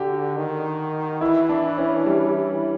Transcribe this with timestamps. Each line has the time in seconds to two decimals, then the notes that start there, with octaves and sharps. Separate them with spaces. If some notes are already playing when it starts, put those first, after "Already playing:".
Already playing: D3 F#4 G4
0.36 D#3
1.21 E3 E4
1.49 D4
1.78 C#4
2.06 G3